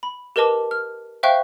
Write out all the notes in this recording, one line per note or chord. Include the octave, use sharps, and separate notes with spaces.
B5
G4 A#4 B4 D#5 A5 D6
F6
C5 E5 F5 G5 C#6 F#6